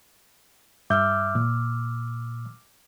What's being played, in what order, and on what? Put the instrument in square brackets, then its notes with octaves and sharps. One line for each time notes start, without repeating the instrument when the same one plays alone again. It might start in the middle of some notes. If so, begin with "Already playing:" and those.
[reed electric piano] G2 E5 G6 [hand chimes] D6 E6 F6
[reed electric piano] A#2